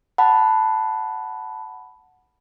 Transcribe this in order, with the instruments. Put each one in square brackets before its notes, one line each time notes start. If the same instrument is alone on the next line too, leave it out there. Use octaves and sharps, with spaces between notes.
[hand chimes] F#5 A5 B5